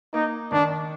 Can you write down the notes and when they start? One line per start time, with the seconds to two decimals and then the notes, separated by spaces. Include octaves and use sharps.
0.14 A#3 D#4
0.52 D#3 D4